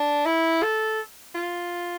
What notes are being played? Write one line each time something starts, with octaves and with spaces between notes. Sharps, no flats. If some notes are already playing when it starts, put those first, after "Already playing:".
Already playing: D4
E4
A4
F4